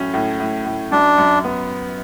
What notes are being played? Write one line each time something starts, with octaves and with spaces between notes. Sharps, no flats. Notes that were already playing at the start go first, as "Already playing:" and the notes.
Already playing: A2 F#3 C#4
A2
A2
A2
F#2 D4
F#2
B3